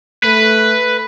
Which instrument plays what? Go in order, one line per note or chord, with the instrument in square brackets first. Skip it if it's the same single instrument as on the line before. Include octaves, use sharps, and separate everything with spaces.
[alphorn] A3 [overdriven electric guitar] B4